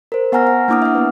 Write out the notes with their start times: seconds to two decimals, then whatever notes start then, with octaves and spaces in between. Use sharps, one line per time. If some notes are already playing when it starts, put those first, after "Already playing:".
0.12 A#4 C5
0.32 B3 F#5 G#5 A#5 F6 A#6
0.47 F#5
0.68 A#3 D4 E4 D6 D#6 F6
0.82 E5 F#5
0.95 B3 B4